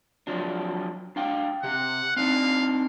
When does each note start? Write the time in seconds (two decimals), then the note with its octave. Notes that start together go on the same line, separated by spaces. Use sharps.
0.27 F3 F#3 D4
1.16 D4 F5 G5
1.63 C3 G4 F#5
2.16 C4 D4 D#4 F5